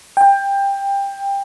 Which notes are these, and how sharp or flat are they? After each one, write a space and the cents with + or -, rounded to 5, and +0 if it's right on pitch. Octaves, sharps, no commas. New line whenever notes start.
G5 +20